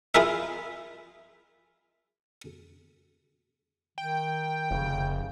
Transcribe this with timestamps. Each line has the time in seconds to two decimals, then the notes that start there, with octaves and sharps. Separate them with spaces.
0.15 E4 F4 G#4 A#4 E5
3.98 D#3 G5
4.71 F1 C#3